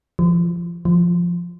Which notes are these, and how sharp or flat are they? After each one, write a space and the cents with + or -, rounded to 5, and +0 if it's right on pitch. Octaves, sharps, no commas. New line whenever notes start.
F3 -25
F3 -5